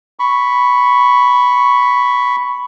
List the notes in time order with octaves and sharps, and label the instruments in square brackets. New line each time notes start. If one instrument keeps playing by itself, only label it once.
[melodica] B5 C#6